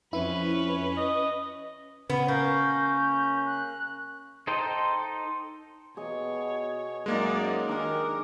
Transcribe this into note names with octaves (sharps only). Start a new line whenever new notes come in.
F2 C#4 E4 B4
D#5
C#3 B3
A#3 C#4 G6
F#6
D#4 A4 C5 D#5 G5
B2 G#4 C#5 D#5
F#2 G#3 A#3 D#4 D5
D#3 D4 G#4 A#4